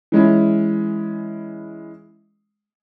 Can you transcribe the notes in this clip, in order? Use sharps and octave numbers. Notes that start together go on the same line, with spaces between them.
E3 G#3 C#4 E4